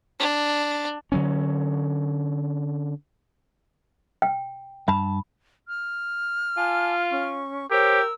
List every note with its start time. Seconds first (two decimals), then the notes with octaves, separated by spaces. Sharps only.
0.19 D4
1.12 D3 F#3 C#4
4.22 G5
4.88 G2 A5 B5
5.68 F6
6.57 F4 G#5 A5 D6
7.11 C#4 C#6
7.71 G4 A#4 C5 C#5 E6